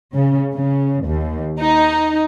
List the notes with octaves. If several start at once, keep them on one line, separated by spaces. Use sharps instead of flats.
C#3
C#3
D#2
D#4